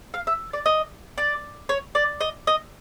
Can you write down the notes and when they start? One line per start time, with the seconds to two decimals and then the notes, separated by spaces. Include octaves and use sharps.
0.14 F5
0.27 E5
0.53 D5
0.66 D#5
1.18 D5
1.69 C#5
1.95 D5
2.21 D#5
2.47 D#5